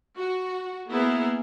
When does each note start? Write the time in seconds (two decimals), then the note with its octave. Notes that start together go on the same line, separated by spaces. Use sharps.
0.19 F#4
0.88 A#3 B3 E4 G#4 A#4